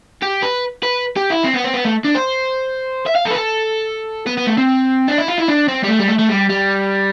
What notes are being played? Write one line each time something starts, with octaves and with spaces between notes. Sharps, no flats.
G4
B4
B4
G4
E4
C4
B3
C4
B3
A3
D4
C5
E5
F5
A4
B4
A4
B3
B3
A3
C4
D4
E4
F4
E4
D4
C4
G3
A3
G3
A3
A3
G3
G3